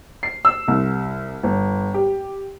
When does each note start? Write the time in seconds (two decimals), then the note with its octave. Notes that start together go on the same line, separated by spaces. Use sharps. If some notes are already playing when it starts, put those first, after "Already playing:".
0.23 C7
0.45 E6
0.68 C2
1.43 G1
1.94 G4